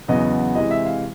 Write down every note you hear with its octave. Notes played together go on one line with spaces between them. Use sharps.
E2 C#3 F#3 B3 D#5
C3 E3 G#3 D#5
E5
F5